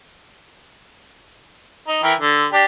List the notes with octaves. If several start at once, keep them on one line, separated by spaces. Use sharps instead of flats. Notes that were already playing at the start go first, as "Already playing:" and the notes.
D#4
E3 A#4 G5
D3
D4 G4